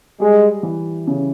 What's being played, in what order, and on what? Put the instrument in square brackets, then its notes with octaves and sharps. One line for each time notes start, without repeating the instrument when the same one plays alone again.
[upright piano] G3 [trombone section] G#3
[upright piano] E3
C#3